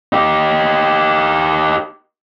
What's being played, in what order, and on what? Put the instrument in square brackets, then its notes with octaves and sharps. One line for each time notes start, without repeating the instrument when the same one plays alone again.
[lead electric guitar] D#4 G4